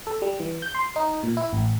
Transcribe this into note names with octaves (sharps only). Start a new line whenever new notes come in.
A4
G3
E3
G6
C6
D#4
A#2
E4
A1